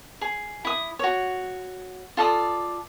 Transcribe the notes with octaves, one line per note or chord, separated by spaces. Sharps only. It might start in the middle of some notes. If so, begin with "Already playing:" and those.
G#4
E4 D#6
F#4 C#5
F4 A4 D5 D#6